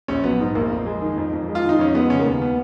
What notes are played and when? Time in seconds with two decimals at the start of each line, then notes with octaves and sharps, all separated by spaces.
0.08 A#1 C#4
0.24 F#3 B3
0.40 G#2
0.55 A#1 A#3
0.71 F2
0.86 G#3
1.02 D#3
1.18 F2
1.33 F2
1.48 G#3
1.55 F4
1.64 D#3 D#4
1.79 F2 C#4
1.94 G#3 B3
2.10 C#3 C#4
2.19 A#3
2.25 D#2 B3
2.42 B3